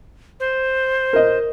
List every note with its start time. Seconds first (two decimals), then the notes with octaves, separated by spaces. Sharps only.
0.40 C5
1.13 A#4 D#5